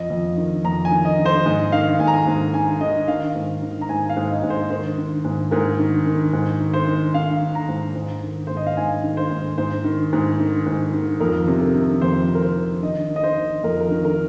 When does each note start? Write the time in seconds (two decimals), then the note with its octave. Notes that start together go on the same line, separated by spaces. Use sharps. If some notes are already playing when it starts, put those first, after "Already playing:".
Already playing: F2 D#5
0.10 F2
0.37 D#3
0.64 F2 A#5
0.85 G#5
0.91 D#3
1.05 D#5
1.19 D#3
1.25 C5
1.46 G#2 D#5
1.72 D#3 F5
1.99 G#2 G#5
2.07 A#5
2.14 G#5
2.27 G#2
2.54 D#3 G#5
2.81 D#3 D#5
3.08 D#3 F5
3.35 G#2
3.62 D#3
3.81 A#5
3.89 G#2 G#5
4.10 F5
4.17 G#2
4.30 D#5
4.43 G#2
4.50 C5
4.70 D#3 C5
4.98 D#3
5.25 G#2
5.51 G#2 A#4
5.79 D#3
6.06 D#3
6.33 G#2
6.60 D#3
6.74 C5
6.87 D#3
7.14 D#3 F5
7.41 D#3
7.55 A#5
7.69 G#2
7.95 G#2
8.23 D#3
8.47 G#2 C5
8.57 D#5
8.67 F5
8.77 G#2 G#5
9.04 D#3
9.17 C5
9.31 G#2
9.58 G#2 C5
9.84 D#3
10.13 G#2
10.40 D#3
10.66 G#2
10.93 D#3
11.20 F2 A#4
11.47 C3
11.61 A#4
11.75 D#3
12.02 F2 C5
12.29 C3
12.35 A#4
12.42 C5
12.56 D#3
12.83 D#3 D#5
13.10 D#3
13.16 D#5
13.23 C5
13.37 D#3
13.64 F2 A#4
13.80 A#4
13.91 D#3
14.05 A#4